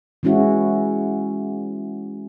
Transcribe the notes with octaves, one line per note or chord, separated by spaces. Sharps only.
E3 G#3 C#4 E4 F#4